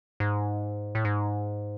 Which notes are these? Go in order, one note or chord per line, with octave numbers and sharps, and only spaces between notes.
G#2
A2
G#2